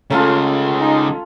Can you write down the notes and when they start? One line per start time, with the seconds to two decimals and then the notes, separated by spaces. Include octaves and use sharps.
0.10 C#3 G#3 A3 C#4 F4 A4 A#5
0.80 D#4